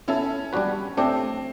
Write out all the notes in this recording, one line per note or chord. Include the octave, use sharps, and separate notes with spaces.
B3 C#4 E4 A4
G3 B3 D4 F#4 B4
A3 C4 D4 G4